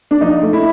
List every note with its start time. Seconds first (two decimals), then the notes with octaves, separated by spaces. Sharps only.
0.11 D4
0.21 F3 D#4
0.42 A3
0.53 E4